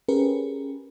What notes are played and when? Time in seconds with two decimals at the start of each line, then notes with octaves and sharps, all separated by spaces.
0.08 C#4 G4 G#4 A#4 B4